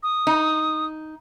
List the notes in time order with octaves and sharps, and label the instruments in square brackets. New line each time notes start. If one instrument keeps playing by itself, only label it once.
[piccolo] D#6
[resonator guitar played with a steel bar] D#4